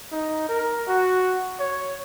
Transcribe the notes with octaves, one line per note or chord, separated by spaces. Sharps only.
D#4
A#4
F#4
C#5